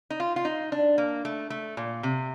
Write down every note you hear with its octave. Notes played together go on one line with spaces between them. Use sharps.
D#4
F4
F4
D#4
D4
A#3
A3
A3
A#2
C3